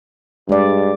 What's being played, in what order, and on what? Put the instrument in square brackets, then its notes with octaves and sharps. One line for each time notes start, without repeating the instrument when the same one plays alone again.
[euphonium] G2 [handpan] G#3 D5